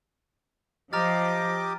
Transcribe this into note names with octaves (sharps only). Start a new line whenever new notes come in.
F3 G4 D#5 A#5 D6 F6 A6